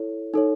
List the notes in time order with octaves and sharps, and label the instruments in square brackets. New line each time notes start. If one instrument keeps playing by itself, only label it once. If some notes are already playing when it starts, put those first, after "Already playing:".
Already playing: [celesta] E4 A4 C#5
D#4 A4 C#5